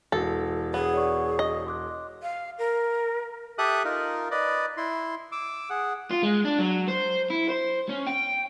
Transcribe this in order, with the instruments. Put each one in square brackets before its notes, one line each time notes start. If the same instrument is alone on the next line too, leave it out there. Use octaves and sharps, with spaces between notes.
[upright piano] E1 [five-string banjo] A4 [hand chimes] A#6
[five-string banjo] B3 [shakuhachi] G#4 [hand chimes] C#5
[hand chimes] C#5 D5 C#6
[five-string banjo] D#5
[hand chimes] C6 D6 F#6
[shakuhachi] F5
A#4
[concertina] G4 A4 E5 D#6 F#6
D#4 F4 A#4
B4 D5 D#5
E4 C6
D6 E6
G#4 F#5
[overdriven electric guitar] F4
G#3
D4
F#3
C5
E4
C5
C#4
G5